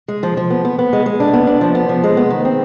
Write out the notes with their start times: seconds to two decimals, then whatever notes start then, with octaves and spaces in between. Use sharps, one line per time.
0.08 G#3
0.23 F3
0.37 F3
0.50 B3
0.65 B3
0.79 B3
0.93 G#3
1.06 G#3
1.20 D4
1.33 B3
1.47 D4
1.61 F3
1.75 B3
1.89 F3
2.04 G#3
2.17 B3
2.30 D#3
2.45 C4